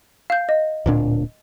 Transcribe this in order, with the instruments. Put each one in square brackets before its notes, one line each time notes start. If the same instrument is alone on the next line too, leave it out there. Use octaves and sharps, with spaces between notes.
[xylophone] F5 G6
D#5
[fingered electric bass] D1 A#2 D4